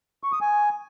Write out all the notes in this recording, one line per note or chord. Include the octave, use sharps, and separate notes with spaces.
C#6
D#6
G#5